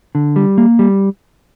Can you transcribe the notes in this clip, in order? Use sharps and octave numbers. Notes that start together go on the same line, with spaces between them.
D3
G3
A#3
G3